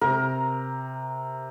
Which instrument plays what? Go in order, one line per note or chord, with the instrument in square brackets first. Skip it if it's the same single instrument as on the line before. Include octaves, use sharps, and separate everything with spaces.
[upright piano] C3 [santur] A#4